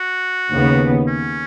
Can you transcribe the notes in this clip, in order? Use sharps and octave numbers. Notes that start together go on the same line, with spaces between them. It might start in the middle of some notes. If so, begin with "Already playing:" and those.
Already playing: F#4
D#2 C#3 B3
C#4